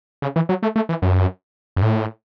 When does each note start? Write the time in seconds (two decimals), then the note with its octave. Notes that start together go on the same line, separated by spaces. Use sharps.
0.22 C#3
0.36 E3
0.49 F#3
0.63 A3
0.76 A3
0.89 E3
1.02 F#2
1.76 F#2
1.82 A2